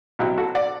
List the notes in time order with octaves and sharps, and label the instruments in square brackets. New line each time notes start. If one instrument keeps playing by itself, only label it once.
[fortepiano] B2 F#3 C4 E4 G4
F#4 A4
D5 F#5